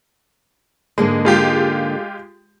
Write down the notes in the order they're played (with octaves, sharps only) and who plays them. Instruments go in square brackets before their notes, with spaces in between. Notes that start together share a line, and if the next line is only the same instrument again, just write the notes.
[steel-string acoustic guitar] G#2 D3 A#3 [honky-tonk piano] G#3
[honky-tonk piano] G#3 F4 G4